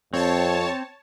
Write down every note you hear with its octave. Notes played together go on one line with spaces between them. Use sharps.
F2 C4 C#5 A5